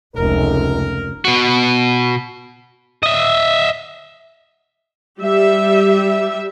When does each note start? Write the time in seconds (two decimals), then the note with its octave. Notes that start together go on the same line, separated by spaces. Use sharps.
0.15 F1 C#2 A#4
1.25 B2 F#4
3.03 D#5 E5
5.19 G3 G4 E5